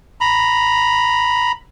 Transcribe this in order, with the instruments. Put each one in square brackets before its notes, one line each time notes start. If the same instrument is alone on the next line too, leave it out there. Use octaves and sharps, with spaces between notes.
[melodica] A#5 B5